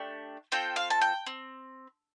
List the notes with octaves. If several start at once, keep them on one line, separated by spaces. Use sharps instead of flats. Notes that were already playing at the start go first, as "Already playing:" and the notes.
Already playing: A3 D4 G4
C4 F4 A4 G5
F5
A5
G5
C4